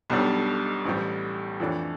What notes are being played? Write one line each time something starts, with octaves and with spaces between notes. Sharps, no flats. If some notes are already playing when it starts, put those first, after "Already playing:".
B1 B2 G3 D4 A4
A1 A2 G3
F2 E3 A3 D4